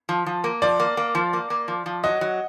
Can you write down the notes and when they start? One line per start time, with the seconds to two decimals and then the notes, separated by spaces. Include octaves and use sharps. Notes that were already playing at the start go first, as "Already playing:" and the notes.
0.09 F3
0.26 F3
0.44 A#3
0.62 F3 D5
0.80 A#3
0.97 A#3
1.15 F3
1.33 A#3
1.50 A#3
1.68 F3
1.86 F3
2.04 F#3 D#5
2.21 F#3